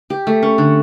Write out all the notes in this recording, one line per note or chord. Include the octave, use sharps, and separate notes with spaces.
G4
A3
C#4
D3